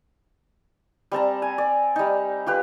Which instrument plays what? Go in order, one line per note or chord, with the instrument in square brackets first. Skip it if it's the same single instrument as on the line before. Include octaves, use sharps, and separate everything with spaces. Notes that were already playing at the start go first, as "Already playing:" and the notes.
[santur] G3 C4 A5 A#5
G#5
D5
G3 D#4
F4 G4 B4